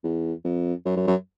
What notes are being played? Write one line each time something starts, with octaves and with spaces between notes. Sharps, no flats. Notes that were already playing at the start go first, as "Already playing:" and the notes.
E2
F2
F#2
F#2
F#2